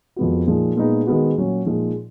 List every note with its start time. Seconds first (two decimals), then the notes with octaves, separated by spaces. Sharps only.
0.16 F2 F3 G#3 B3 F#4
0.47 A#2 F3 G#3 D#4 G#4
0.76 A#2 G#3 B3 D#4
1.07 D#3 G#3 B3 F#4
1.36 A#2 F#3 C#4
1.66 A#2 F3 G#3 D#4